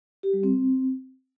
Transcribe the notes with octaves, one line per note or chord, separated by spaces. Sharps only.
G4
G3
C4